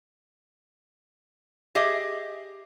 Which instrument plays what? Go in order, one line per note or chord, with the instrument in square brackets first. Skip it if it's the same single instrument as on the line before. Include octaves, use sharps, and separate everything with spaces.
[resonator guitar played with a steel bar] G4 G#4 D#5 E5